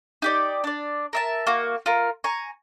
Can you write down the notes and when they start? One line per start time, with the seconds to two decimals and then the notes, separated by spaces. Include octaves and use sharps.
0.22 D#4 G4 D5
0.64 D4 D5
1.13 A#4 E5 A5
1.47 A#3 F#4
1.86 F4 A#4
2.24 G#5 A#5 C#6